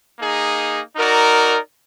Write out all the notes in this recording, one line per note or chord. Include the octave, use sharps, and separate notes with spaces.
A#3 D#4 G#4
D#4 F#4 A#4 D5